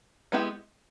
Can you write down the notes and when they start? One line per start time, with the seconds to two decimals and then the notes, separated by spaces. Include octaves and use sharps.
0.32 G#3 B3 E4 G4